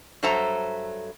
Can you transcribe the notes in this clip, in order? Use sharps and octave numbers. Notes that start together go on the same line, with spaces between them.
G2 F#3 A4 C5 E5 A#5